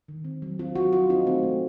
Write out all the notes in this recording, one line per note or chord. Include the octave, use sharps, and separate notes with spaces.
D#3
C4
F#3
C4 F4
F#3 F#4
F#3 F4
C4 D#4
A3 C4
A3